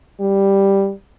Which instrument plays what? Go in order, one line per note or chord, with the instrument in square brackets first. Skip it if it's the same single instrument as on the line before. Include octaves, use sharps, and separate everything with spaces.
[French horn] G3